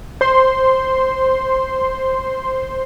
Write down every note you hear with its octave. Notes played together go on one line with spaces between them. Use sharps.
C5 C6